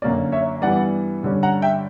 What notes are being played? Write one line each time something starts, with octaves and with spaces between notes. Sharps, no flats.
F#2 D3 A#3 C#4 D5
C#5 E5
G2 E3 G3 B3 D5 F#5
G2 D3 G3 C#4
F#5 A#5
E5 G5